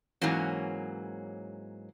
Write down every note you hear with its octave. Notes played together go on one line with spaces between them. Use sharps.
G#2 E3 F#3 A#3 C#4